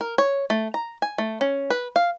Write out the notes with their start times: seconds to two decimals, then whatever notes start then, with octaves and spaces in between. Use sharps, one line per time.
0.01 A#4
0.18 C#5
0.50 A3
0.74 A#5
1.02 G#5
1.18 A3
1.41 C#4
1.70 B4
1.96 F5